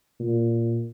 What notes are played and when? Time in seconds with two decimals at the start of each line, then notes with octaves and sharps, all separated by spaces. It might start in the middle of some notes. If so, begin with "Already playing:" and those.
0.20 A#2